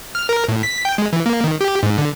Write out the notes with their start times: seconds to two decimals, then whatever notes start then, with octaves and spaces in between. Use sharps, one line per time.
0.15 F6
0.29 A#4
0.48 A2
0.63 B6
0.85 G5
0.98 G#3
1.13 E3
1.26 A#3
1.44 D#3
1.61 G4
1.83 G#2
1.98 D3